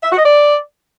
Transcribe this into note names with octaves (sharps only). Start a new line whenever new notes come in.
E5
F#4
D#5
D5